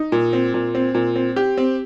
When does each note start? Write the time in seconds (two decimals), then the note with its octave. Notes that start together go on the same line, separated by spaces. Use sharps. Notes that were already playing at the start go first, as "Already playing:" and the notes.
Already playing: D#4
0.12 A#2
0.33 C4
0.54 A#2
0.75 C4
0.95 A#2
1.16 C4
1.36 G4
1.57 C4